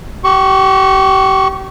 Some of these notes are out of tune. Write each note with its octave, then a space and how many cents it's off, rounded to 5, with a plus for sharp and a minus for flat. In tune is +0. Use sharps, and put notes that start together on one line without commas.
G4 -35 C#6 +0